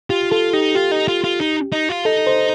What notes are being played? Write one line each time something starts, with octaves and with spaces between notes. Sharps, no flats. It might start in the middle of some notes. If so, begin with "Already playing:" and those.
F4 G4
F4 A4
D#4 G4
F4 G4
D#4
F4
F4
D#4
D#4
F4
D#4 A4
C5